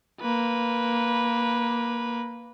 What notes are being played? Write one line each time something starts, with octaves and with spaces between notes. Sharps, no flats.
A#3 B4